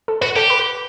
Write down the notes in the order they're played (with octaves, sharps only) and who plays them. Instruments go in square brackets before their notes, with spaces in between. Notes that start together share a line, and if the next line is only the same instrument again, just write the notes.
[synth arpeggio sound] A4
[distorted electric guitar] F#4 [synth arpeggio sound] B4
[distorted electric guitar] G4 [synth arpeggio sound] A4
[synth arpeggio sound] B4